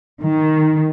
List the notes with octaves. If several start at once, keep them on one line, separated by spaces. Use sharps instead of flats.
D#3